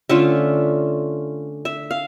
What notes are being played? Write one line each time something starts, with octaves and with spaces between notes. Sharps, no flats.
D3 A3 C#4 F4 E5
E5
F5